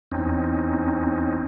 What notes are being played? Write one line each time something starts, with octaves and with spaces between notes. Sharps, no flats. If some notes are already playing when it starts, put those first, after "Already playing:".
E2 C4 C#4 D#4